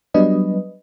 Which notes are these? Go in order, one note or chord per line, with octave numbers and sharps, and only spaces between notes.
F#3 G3 B3 D4 B4 D#5